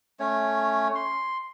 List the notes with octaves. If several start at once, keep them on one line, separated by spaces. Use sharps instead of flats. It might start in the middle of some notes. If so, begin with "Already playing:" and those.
A3 C#4 C#5
C6